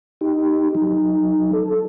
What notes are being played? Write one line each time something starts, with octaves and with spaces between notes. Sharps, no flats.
D#4 G4
F#3 D#4
A4